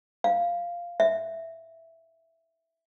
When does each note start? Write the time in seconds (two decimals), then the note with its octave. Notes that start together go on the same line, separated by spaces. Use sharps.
0.24 F5
1.00 E5